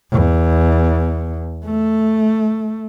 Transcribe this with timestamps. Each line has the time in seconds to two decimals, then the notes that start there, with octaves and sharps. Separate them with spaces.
0.11 E2
1.65 A3